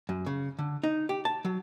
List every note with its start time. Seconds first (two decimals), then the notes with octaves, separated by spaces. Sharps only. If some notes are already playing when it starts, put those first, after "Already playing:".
0.09 F#2
0.26 C#3
0.59 D3
0.84 D#4
1.09 G4
1.25 A5
1.45 F#3